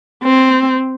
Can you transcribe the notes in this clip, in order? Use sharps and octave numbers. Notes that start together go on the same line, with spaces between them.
C4